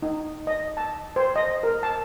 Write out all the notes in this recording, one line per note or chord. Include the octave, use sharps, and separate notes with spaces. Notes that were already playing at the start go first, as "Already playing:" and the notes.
D#4
D#5
A5
C5
D#5
A#4
A5